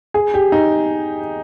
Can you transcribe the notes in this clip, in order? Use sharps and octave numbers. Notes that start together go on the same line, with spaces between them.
G#4
G4
D#4